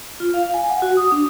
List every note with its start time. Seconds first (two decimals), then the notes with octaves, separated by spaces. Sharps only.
0.20 F4
0.34 F5
0.54 G#5
0.70 F#5
0.82 F#4
0.97 D#6
1.12 D4